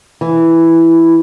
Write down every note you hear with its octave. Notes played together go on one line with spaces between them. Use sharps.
E3